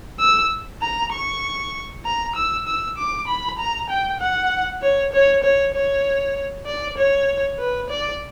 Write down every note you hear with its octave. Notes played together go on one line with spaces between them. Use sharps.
E6
A#5
C#6
A#5
E6
E6
D6
B5
A#5
G5
F#5
C#5
C#5
C#5
C#5
D5
C#5
B4
D5